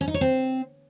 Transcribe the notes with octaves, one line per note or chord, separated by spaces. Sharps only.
C#4
D#4
C#5
C4